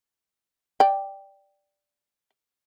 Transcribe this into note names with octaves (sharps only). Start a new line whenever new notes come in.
D5 G5